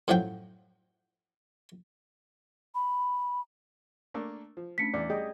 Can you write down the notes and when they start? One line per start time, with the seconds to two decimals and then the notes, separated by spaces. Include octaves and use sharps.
0.08 F#2 A2 F3 F#3 F#5 G5
2.75 B5
4.14 A3 A#3 D4
4.57 F3
4.78 A3 C#4 D4 B6 C#7
4.94 E2 D5
5.10 G3 G#4 D#5 G5